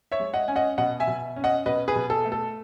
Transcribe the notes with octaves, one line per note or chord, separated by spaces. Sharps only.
C#5 E5
G#3
D#5 F#5
C#4 G#5
D#5 F#5
B2 D#5 F#5
E5 G#5
B2
C#4
D#5 F#5
B2 B4 D#5
G#4 B4
B2
A4
A3
A4